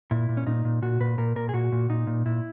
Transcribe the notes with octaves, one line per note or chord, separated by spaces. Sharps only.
A#2 E4
A#2
C#4
A#2 D#4
A#2
A#2 F#4
A#2 B4
A#2 A#4
A#2 A#4
G#4
A#2 F#4
A#2
A#2 D#4
A#2
A#2 E4